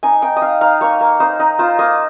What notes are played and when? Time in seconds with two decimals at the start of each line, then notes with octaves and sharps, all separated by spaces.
0.03 D#4 G#5
0.22 D#4 G5
0.36 D#5
0.42 D#4 F5
0.61 D#4 F5
0.81 A#3 C#5
1.01 A#3
1.20 D#4 C5
1.40 D#4
1.59 F4 C5
1.79 A#3 D#5